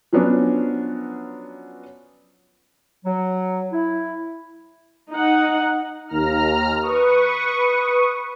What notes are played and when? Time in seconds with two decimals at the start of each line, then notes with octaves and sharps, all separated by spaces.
0.13 F3 F#3 B3 C#4 D4
3.04 F#3
3.72 E4
5.11 D#4 F#5
6.08 D#2 A#5 F6
6.82 B4 C#6 D#6